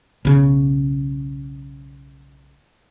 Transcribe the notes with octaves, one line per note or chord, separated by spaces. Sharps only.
B1 C#3